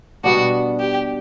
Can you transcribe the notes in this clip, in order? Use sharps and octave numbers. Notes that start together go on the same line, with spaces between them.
B2 G3 B3 D4 F#4
G4